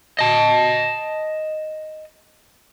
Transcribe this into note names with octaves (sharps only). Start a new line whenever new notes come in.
D#5 A5